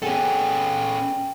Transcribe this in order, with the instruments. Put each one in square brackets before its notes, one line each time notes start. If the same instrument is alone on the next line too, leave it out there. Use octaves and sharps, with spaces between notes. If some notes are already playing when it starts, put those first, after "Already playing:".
[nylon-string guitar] B3 G#4 [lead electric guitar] C#4 A4 [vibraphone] G5